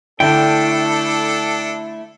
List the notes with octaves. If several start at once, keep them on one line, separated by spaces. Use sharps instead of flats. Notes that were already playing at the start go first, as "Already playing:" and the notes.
D3 A3 D4 E4 A4 G5